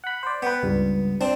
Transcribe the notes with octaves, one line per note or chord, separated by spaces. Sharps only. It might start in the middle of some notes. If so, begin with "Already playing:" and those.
F#5 B5
C5 D5
B3 B4 G5
C#2 G2
C4 D4